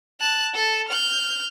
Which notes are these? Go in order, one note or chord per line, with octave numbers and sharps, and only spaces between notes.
A5 F#6
A4 A5
F6 G6